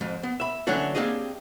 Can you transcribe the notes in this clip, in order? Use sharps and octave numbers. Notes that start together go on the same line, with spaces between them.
F2 G#2
B3
E5 B5
D3 E3 F#3 C#4 D4 F#4
A#3 C4 D4 G4 G#4 D#5